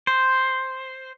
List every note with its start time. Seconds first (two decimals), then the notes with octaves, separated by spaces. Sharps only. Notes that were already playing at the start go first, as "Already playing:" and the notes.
0.07 C5